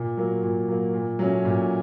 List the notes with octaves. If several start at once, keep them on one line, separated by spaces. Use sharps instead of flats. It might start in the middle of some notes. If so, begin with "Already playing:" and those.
Already playing: A#2
F#3 A#3
A#2
F#3 A#3
A#2
F#3 A3 C#4
A#2